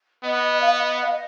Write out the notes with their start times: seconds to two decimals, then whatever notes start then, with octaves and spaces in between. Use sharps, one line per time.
0.23 B3 D#5
0.61 F5
0.68 D#5
1.03 F5
1.12 D#5